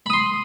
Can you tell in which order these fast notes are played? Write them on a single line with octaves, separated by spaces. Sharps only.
B5 D#6 C6